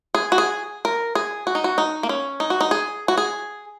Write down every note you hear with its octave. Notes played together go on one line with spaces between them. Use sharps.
G#4
F#4
G#4
A#4
G#4
F#4
D#4
F#4
D#4
A#3
C#4
D#4
F#4
D#4
G#4
F#4
G#4